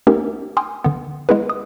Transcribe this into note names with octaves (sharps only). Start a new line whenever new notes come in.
A3 B3 C#4 D#4 G4 A#4
G5 G#5 C6 D#6 F6
D3 B3
G#3 B3 E4 G#4 B4
D#6